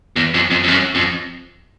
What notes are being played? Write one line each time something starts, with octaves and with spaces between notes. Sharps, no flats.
E2
F2
F2
F2
F#2
F2